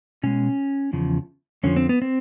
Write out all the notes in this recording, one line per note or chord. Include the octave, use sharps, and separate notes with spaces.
B2 G#3 C#4
E2 C#3 F3
F2 D3 F3 C#4
C4
B3
C4